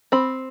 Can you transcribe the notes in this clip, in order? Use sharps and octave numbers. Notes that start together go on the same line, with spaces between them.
C4 B5